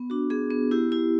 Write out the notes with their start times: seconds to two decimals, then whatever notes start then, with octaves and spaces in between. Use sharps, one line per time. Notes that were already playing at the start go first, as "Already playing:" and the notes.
Already playing: B3
0.10 D4 F#4
0.30 B3 G#4
0.51 B3
0.71 E4 G4
0.92 E4 G4